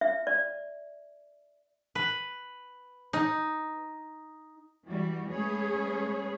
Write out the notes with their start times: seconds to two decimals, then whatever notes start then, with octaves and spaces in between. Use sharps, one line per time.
0.01 E5
0.27 D5
1.95 B4
3.13 D#4
4.86 E3 G3 F#4
5.28 G#3 A3 C#4 G#4 B4 C#5